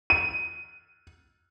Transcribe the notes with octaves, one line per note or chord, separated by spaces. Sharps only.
D#7